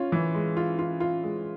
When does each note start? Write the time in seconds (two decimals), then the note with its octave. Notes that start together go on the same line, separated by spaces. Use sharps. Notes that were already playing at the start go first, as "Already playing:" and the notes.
Already playing: C#4 F4
0.12 E3
0.34 G#3
0.57 F4
0.79 F4
1.00 F4
1.24 G#3